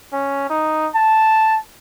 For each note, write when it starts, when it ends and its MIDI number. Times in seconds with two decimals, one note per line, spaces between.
0.13 0.49 61
0.50 0.88 63
0.95 1.56 81